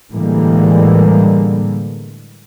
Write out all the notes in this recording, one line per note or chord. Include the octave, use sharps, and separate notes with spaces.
A2 D3 E3 G3 G#3 A#3